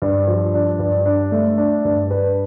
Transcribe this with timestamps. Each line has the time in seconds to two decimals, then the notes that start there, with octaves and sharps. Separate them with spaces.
0.02 G2
0.27 F3
0.54 D4
0.79 G2
1.06 D4
1.32 A3
1.58 D4
1.85 G2
2.11 B4